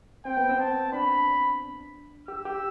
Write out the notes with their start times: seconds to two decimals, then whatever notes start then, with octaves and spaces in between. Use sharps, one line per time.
0.25 C4 G5
0.37 B3
0.49 C4
0.59 A5
0.92 D4 B5
2.28 G4 E6
2.45 G4